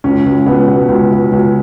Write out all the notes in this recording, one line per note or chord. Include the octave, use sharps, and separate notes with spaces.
C#2 C#4
C#2
C#2 B3
B2
C#2
C#2
C#2